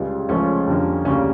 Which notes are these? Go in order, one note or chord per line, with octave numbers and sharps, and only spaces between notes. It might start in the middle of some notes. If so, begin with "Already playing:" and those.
Already playing: C#2 C#3 G3
C#2 C#3 F3 A3 C#4
F2 D3 G3 A#3
D2 C#3 G3 A#3 C#4